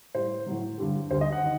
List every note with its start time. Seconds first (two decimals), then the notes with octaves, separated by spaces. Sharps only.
0.14 A2 G3 C5
0.46 A2 F#3
0.78 G2 D3 G3
1.10 D2 D3 G3 C5
1.21 D#5
1.32 F#5
1.43 D#3